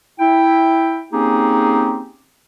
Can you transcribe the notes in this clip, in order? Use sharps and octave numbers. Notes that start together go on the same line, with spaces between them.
E4 G5
A#3 C4 C#4 D#4 G4 G#4